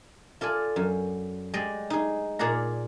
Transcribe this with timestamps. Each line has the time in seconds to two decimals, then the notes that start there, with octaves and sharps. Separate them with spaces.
0.41 F4 A4 D5 G#5
0.76 F#2
1.54 G#3 G4 D5 D#5
1.90 D#4 G#4
2.39 A#2 G#4 D5 F#5 A#5